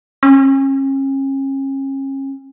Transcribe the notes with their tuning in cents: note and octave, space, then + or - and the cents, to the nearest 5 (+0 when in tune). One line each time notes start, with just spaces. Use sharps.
C#4 -35